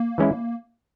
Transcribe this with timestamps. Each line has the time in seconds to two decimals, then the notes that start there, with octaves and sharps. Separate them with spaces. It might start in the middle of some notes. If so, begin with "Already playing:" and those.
Already playing: A#3
0.18 E3 G#3 C#4 E4